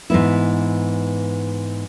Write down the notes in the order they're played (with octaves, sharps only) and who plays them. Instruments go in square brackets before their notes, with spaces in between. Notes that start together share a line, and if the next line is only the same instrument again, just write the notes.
[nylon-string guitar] G#2 E3 B3 E4